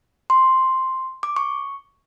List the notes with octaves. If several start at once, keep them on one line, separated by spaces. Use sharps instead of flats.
C6
D6
C#6